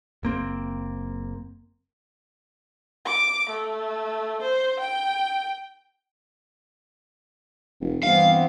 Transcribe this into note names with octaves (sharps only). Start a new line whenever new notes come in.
F#1 A#3 C4
D6
A3
C5
G5
F1
G2 E3 B3 C4 F5